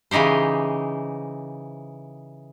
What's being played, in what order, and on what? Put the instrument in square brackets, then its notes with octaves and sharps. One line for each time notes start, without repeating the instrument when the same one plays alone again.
[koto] C#3 E3 D#4 G4 C5